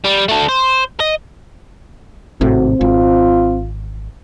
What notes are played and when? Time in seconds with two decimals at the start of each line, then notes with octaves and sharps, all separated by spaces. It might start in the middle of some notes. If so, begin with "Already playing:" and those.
0.05 G3
0.29 A3 D4
0.49 C5
1.00 D#5
2.41 G#1 A2 C3 C4 F#4
2.81 G#1 F4